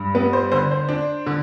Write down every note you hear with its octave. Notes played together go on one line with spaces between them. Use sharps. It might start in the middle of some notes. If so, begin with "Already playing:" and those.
Already playing: G2
B3 B4
C5
D3 C5
C5
D4
D3